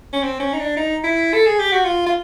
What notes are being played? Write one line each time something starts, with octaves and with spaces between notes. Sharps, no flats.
C#4
C4
C#4
D#4
D4
D#4
E4
A4
G#4
G4
F#4
F4
F4